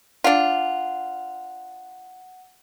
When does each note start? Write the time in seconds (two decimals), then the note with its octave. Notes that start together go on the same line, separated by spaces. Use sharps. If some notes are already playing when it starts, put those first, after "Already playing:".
0.24 D4 F4 F#5